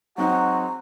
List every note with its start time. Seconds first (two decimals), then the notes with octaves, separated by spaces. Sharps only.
0.18 F#3 G#3 C4 D#4 F#4 F#5 A#5